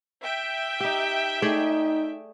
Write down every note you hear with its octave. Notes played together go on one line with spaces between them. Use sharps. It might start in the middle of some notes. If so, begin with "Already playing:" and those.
E5 G5
D#4 G4
A3 D#4 G#4 D5